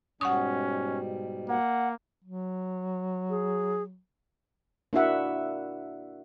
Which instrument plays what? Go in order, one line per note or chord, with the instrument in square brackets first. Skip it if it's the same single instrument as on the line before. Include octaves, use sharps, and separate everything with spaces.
[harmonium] G#2 B2 G3 [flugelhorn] C#4 [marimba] F#5 C#6 D#6
[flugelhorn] A#3 [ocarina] F#5
[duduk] F#3
[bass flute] G#4
[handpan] A#3 D4 E4 F#4 E5 F#5